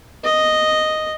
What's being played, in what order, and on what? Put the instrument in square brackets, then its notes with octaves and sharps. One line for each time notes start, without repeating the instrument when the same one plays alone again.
[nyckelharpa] D#5